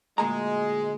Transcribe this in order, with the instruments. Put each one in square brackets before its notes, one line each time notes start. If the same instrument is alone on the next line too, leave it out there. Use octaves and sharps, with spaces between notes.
[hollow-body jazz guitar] D2 A#2 A#5 [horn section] G#3